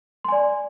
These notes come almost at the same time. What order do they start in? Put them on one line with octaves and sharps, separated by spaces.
C6 G#5 D5